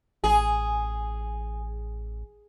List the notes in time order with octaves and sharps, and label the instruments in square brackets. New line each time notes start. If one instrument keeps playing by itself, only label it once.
[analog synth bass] A1 [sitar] G#4